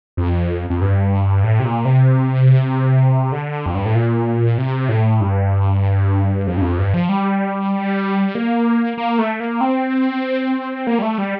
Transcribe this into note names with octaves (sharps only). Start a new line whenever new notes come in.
F2
F2
G2
A2
C3
A#2
C3
D3
F2
G2
A2
A#2
C3
A2
G2
F2
G2
F2
G2
F3
G3
A#3
A#3
A3
A#3
C4
A#3
G3
A3
G3